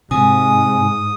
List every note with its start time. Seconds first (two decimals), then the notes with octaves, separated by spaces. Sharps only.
0.11 G#2 C3 G#5 D#6